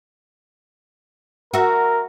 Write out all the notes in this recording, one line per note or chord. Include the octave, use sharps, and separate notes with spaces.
F#4 A#4 E5